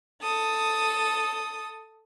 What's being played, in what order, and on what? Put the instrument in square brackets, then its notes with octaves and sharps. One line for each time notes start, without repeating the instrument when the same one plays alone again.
[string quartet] A4 D#6